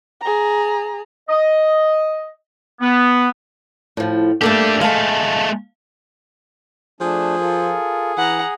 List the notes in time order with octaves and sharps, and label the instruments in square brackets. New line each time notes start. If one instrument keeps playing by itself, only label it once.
[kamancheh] G#4 A#5
[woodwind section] D#5
B3
[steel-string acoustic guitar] A2 F3
[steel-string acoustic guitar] A3 A#3 A4 [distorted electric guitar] D4 G4
[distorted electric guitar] G#3 A3 [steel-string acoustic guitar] F5 A5
[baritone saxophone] F3 [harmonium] A3 D4 [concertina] G#4
[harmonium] F4 A4 A#4
[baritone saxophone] E3 [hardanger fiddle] F#5 A#5